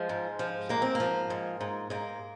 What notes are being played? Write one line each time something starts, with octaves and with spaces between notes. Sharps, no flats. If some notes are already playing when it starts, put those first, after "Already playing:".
Already playing: F3 G#3
G#2
F3
G#2 A#3
C4
A#3
F3
G#2
G#2
G#2 A#3